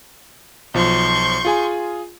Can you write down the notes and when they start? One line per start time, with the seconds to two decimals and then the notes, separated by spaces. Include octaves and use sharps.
0.74 B1 F3 C6 C#6 G6
1.45 F4 G#4 G#5